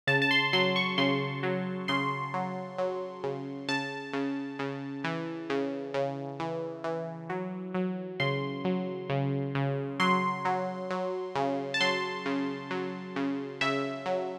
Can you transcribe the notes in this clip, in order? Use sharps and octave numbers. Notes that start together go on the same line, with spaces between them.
C#3 A5
A5
C6
F#3 C6
C#6
C#3 C6
F#3
C#3 C6
F#3
F#3
C#3
C#3 A5
C#3
C#3
E3
C#3
C#3
E3
E3
F#3
F#3
C#3 C6
F#3
C#3
C#3
F#3 C6
F#3
F#3
C#3
A5
F#3 C6
C#3
F#3
C#3
C#3 E5
F#3